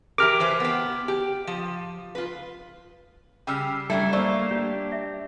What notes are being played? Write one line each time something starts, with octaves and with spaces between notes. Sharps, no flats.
E3 G4 A#4 D6 F6
E3 B4 C5
B3 G4
G4
F3
F4 B4
C#3 G3 G5 E6 F6
F#2 G3 A3 D4 E4 A4
A3 A#3 C5 D5 F5 C#6 E6
D4 G4
E5